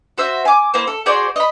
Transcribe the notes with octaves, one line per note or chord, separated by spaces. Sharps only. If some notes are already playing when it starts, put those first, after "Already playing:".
F#4 C5 E5
G#5 D6
A#3 E4 C5
A4
F#4 G#4 C5 D5
D#5 B5